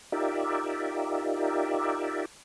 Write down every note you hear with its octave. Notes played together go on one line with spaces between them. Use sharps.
D#4 F4 G4 A#4 D5 E5